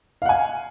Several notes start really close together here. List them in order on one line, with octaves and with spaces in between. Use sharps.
F5 F#5 G#5